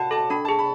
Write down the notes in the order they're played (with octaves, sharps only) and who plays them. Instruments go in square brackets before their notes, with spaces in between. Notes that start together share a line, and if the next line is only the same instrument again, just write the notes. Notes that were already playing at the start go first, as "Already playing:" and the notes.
Already playing: [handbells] F#4 [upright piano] F#5 A5
[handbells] A4 [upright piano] A5
[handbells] D4 [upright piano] B5
[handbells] G#4 [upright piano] A5
[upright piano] B5